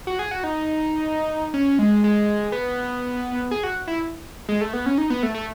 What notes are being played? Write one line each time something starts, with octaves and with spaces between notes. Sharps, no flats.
F#4
G#4
F#4
D#4
C#4
G#3
G#3
B3
G#4
F#4
E4
G#3
A3
B3
C#4
D#4
B3
A3
A3